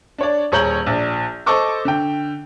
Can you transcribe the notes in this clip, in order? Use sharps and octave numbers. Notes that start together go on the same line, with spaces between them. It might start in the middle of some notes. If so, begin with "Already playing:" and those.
D4 C#5 D5
D#1 G#4 C#5 A#5 G6 F#7
A#1 D5
A4 C5 D#5 C#6 D6 E6
D3 G5